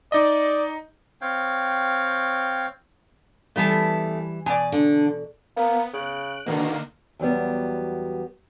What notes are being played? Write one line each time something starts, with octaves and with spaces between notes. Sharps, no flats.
D#4 D5 D#5
C4 C#5 F5 G5
E3 G3 A3 B3 E4 A4
B2 D5 G#5
D3
A#3 B3
C#3 F#6 D7
B2 D3 D#3 A#3
E2 F#3 G3 B3